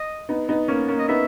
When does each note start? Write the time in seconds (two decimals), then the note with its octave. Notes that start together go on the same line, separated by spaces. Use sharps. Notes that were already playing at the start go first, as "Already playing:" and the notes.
Already playing: D#5
0.29 B3 D#4
0.49 B3 D#4
0.68 A#3 C#4
0.88 A#3 C#4
0.99 D#5
1.09 B3 D#4 E5